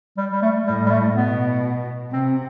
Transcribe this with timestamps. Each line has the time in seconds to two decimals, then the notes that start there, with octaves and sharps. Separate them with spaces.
0.17 G3
0.32 G3
0.42 A3
0.66 A2 G3
0.86 G3
0.91 A3
1.14 B2 B3
2.12 C3 C4